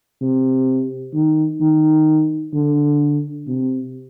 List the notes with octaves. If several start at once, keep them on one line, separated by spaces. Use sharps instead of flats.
C3
D#3
D#3
D3
C3